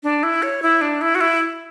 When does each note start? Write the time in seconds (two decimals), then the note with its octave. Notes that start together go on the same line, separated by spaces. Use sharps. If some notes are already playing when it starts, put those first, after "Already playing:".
0.03 D4
0.23 E4
0.43 C#5
0.62 E4
0.81 D4
1.01 E4
1.15 F#4
1.21 E4